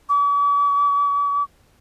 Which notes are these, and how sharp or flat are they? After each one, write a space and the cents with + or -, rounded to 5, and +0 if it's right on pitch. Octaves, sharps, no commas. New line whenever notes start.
D6 -45